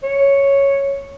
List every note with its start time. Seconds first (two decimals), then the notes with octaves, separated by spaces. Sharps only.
0.03 C#5